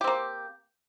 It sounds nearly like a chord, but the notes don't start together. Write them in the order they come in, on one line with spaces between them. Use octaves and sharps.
G4 C4 A#3